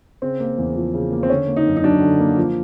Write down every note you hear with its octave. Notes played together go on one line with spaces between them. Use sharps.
C#3 C4
A#3
E2
F3
C#3
A#3
C4
D3 C#4
A#3
D#4
F#2
D#4
F#3 D4
D3
A#3
F3